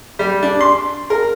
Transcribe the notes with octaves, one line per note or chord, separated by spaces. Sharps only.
G3
D4
C6
A#4